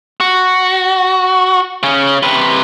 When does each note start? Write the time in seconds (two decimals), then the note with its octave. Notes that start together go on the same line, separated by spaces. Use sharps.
0.20 F#4
1.83 C#3 C#4
2.23 C3 B4